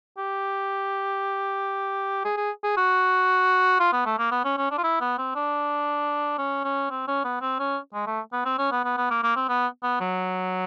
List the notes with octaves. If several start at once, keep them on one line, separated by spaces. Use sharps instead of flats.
G4
G#4
G#4
G#4
F#4
F4
B3
A3
A#3
B3
C#4
C#4
D4
F4
E4
B3
C4
D4
C#4
C#4
C4
C#4
B3
C4
C#4
G#3
A3
B3
C4
C#4
B3
B3
B3
A#3
A#3
C4
B3
B3
F#3